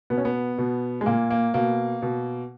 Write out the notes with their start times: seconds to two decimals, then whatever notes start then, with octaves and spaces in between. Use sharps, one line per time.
0.10 B2 B3
0.18 C#4
0.25 B3
0.58 B2
1.01 G#3
1.06 A#2 A#3
1.30 A#3
1.54 B2 A#3
2.02 B2